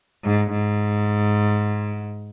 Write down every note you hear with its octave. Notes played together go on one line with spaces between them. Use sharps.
G#2
G#2